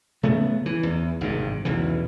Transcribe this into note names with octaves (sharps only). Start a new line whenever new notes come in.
C#3 A3 B3
E3
E2
G#1 G2 C3
B1 E2 C#3 E3